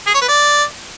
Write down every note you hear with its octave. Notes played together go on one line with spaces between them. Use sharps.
G#4
C#5
B4
D5